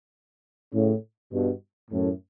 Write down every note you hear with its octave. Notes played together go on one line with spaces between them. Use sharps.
A2 C#3
G2 B2
F#2 A2